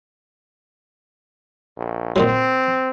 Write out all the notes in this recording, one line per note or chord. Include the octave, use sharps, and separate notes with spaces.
A#1
A#2 D#3 F#3 C4